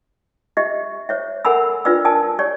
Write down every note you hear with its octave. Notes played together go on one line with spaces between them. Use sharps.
G4 D#5 E5
C5 C#5 E5
A4 A#4 F#5 G#5 B5 E6
D4 F4 B4 D5 E6
A#4 D5 G#5 A5 D#6
G4 C#5 D5